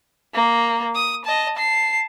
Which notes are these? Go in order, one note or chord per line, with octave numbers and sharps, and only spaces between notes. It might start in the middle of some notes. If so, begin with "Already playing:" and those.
A#3
D#6
D#5 A5
A5 C7